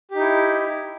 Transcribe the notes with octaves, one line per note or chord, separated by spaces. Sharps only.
D#4 E4 G4